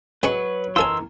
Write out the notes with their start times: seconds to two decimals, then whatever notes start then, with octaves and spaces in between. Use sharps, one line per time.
0.23 F#3 G#3 B4 G#5 C#6
0.76 E3 F4 A4 A#4 G#5 C6 E6